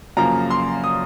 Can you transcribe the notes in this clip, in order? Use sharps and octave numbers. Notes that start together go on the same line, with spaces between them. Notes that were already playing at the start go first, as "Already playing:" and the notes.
F#2 C#3 F3 A#3 A#5
C6
D#6